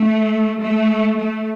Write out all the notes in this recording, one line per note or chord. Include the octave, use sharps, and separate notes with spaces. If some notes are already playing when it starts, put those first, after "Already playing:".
Already playing: A3
A3
A3